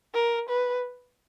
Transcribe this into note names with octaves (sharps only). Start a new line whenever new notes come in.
A#4
B4